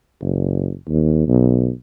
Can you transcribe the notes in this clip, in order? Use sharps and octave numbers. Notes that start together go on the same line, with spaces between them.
F#1
D#2
B1